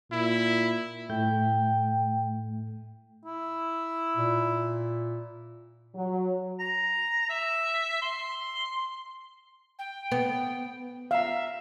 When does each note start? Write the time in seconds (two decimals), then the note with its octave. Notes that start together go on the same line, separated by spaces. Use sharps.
0.12 A#2 E4
1.09 A2 A3 G5 G6
3.26 E4
4.16 A#2
5.95 F#3
6.60 A#5
7.30 E5
8.02 C6
9.79 G5
10.12 B3
11.11 E5 F5 A#5